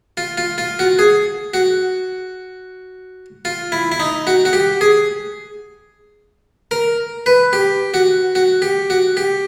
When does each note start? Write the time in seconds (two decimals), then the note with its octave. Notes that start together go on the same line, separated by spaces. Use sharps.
0.17 F4
0.38 F4
0.58 F4
0.79 F#4
0.99 G#4
1.54 F#4
3.45 F4
3.72 E4
3.92 E4
4.00 D#4
4.27 F#4
4.45 F#4
4.53 G4
4.81 G#4
6.71 A#4
7.26 B4
7.53 G4
7.94 F#4
8.35 F#4
8.62 G4
8.90 F#4
9.17 G4